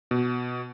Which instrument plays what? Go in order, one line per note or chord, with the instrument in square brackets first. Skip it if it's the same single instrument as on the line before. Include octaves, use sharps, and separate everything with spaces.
[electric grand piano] B2